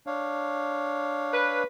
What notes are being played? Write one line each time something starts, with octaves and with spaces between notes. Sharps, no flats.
D4 C#5 F5
B4